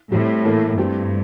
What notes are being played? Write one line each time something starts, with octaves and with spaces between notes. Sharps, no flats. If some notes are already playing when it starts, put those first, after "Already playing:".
A2 G3 C4 E4
E3 A#3 E4 A4
G2 A3 C4 E4 G4